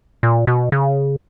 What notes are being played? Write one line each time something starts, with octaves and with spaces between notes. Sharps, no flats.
A#2
B2
C#3